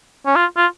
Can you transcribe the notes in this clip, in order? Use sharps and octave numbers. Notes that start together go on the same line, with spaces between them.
C#4
F4
F4